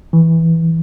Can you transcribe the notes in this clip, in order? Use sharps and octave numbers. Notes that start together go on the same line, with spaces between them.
E3